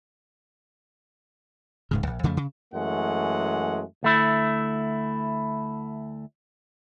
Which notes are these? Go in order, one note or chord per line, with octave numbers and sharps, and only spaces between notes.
D1 G#2 C#3
A#1
F2 C#3 F3 A3
C#3
F#2 E3 G#3 A3 F#5
D2 A3 E4